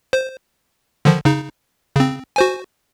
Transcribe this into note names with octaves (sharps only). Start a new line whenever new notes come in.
C5
D3 D#3 F3
C#3 D#4
C#3 C4
F#4 C5 G#5